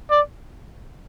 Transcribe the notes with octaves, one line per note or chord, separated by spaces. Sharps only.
D5